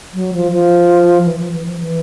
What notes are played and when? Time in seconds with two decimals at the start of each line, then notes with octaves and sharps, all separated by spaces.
0.14 F#3
0.33 F3
0.52 F3
1.25 E3
1.39 F3
1.52 E3
1.66 F3
1.80 E3